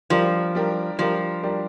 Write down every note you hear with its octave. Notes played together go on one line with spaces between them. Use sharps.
F3 G3 D4 G4 A#4
G3 D4 G4 A#4
F3 G3 D4 G4 A#4
G3 D4 G4 A#4